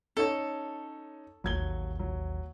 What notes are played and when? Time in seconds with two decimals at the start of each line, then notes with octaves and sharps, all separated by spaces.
0.17 C#4 D#4 A4 C#5
1.44 A1 D#2 F#3 G#6 G7
1.99 F#3